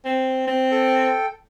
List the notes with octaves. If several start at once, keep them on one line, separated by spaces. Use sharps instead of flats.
C4
C4
A4 G5